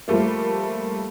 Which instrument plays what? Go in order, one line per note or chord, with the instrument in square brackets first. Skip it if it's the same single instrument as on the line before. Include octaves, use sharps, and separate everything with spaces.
[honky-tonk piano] F3 G3 A3 A#3